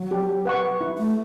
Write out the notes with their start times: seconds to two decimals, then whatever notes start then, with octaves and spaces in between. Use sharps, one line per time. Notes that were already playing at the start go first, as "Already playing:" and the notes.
Already playing: F#3
0.11 G4
0.45 B4 F#5 C#6
0.81 E4
0.98 A3